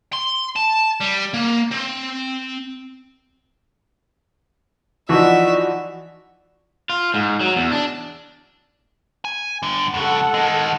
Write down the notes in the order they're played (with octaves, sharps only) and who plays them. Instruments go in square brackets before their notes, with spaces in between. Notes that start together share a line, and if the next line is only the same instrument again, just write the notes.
[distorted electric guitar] C6
A5
G3
A#3
C4
[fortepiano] E3 F3 D#4 [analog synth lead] F#4 [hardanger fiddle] D5 E5
[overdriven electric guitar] F4
G#2
F#3
E2
D4
[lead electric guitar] G#5
G2 D3
[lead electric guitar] F2 C#3 [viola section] A4 F#5
[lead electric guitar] D#3 G#3